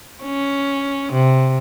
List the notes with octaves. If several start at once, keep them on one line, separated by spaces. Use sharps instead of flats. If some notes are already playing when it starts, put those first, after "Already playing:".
C#4
C3